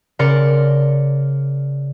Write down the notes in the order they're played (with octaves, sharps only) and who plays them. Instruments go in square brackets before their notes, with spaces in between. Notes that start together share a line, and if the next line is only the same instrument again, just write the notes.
[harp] C#3 A#4 D5 C6 C#7